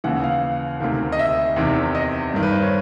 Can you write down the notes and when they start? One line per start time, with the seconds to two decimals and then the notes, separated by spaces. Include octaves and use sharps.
0.04 D#2 C#3 E3 F#5
0.24 F5
0.80 D2 C3 D#3
1.12 D#5
1.19 E5
1.56 E2 C3 D#3
1.95 D#5
2.34 G2 D#3
2.43 B4
2.52 C5
2.63 C#5